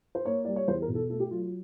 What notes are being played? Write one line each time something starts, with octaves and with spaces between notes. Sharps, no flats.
C5
A#3 C#5
G3 D5
C#5
E2 C5
A#4
B2
A4
A3 A4
G4
F#3 F4
F4